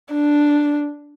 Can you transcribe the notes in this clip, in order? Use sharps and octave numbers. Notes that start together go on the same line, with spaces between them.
D4